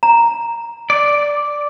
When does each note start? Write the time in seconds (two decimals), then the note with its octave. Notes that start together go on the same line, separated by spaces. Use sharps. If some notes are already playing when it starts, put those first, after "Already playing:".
0.03 A#5
0.90 D5